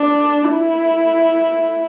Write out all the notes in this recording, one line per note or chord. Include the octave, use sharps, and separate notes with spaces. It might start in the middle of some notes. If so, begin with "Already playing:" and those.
Already playing: D4
E4